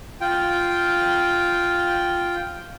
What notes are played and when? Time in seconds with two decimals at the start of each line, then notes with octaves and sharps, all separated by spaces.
0.21 F4 G5